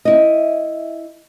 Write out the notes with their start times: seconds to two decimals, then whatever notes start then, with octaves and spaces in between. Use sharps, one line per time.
0.05 E4 D#5